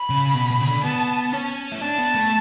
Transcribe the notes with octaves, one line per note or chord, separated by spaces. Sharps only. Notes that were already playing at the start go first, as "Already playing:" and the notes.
Already playing: B5
C#3
B2
B2
C#3
D3
B3 A5
C#4
E4
D4 A5
B3
A3